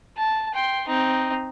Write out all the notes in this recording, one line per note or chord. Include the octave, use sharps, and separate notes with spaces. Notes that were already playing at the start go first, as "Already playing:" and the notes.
A5
G5 C6
C4 D#4